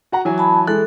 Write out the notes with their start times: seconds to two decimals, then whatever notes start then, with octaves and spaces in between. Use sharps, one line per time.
0.12 F#4 F#5 A#5
0.25 E3 F#3 G#5
0.38 A5 B5
0.67 E3 G#3 A4 F#6